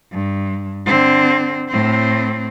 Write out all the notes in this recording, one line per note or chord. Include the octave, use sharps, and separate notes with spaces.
G2
D3 C4
A2 C4